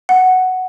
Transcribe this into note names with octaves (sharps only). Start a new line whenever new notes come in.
F#5